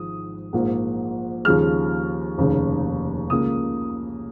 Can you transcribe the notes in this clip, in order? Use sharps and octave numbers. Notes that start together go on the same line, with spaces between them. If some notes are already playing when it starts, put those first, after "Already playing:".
Already playing: G#1 G#2 F3 G#3 D#6
A#1 G#2 F3 A#3
D#2 C#3 F3 G#3 F6
F1 D#2 C#3
C#2 C#3 A#3 D#6